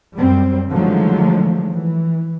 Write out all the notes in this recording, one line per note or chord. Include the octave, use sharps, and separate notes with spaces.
F#2 G3 C4
D3 D#3 F3 F#3 G#3 A3
E3